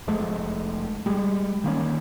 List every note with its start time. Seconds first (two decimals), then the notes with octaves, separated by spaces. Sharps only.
0.07 F1 F3 G#3 A3
1.06 G3 G#3
1.64 D#3 A#3 C#4